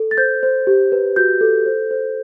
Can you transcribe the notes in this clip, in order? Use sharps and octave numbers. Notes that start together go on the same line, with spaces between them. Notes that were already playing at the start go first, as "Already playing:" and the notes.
Already playing: A4
A6
C5 G6
C5
G4
B4
F#4 G6
A4
C5
C5